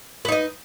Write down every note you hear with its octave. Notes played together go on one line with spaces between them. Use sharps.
D#4 B4 D#5